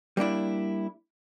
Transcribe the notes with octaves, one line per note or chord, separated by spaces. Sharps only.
G3 A#3 D4 E4